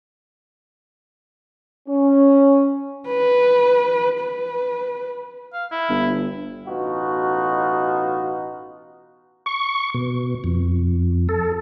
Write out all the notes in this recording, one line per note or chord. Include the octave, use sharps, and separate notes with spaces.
C#4
B4
B4
F5
E4
G1
A1 B2 D#4 F4 F#4
C#6
B2
F2
A4